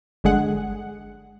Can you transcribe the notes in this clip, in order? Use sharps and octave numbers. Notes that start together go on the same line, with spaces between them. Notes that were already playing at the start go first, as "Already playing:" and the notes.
G1 D3 G#3 G#4 F#5